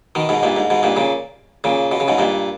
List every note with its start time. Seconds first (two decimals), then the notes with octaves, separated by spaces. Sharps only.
0.15 B2 D#3
0.29 G#2 B2
0.43 G2 A#2
0.57 G#2
0.70 G#2 B2
0.83 G2 A#2
0.96 A#2 C#3
1.64 A#2 C#3
1.92 B2
2.00 C#3
2.08 G#2 B2
2.18 G2 A#2